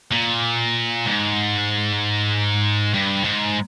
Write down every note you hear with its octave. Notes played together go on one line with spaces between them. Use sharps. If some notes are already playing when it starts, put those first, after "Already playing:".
A#2
G#2
G2
G#2